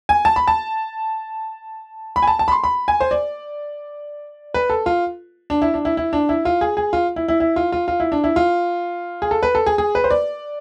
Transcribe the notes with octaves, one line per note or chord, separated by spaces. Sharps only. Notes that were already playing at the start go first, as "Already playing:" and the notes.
G#5
A5
B5
A5
B5
G#5
A5
A5
B5
C6
B5
G#5
C5
D5
B4
A4
F4
D4
E4
D4
E4
E4
D4
E4
F4
G#4
G#4
F4
E4
E4
E4
F4
F4
F4
E4
D4
E4
F4
G#4
A4
B4
A4
G#4
G#4
B4
C5
D5